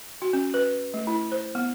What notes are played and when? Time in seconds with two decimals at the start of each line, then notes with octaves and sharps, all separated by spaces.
0.22 F#4
0.33 C#4
0.54 B4
0.94 A3
1.07 E4
1.32 C5
1.55 B3